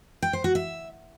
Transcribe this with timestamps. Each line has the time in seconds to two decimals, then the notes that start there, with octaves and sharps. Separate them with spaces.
0.22 G5
0.33 C5
0.44 F#4
0.55 E5